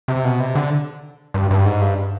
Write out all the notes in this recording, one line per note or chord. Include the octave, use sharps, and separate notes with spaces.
C3
B2
C3
D3
G2
G2
G#2
G2